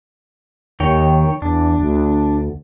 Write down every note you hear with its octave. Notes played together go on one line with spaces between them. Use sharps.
D#2 D#3 C#5 G5
E2 D4
D2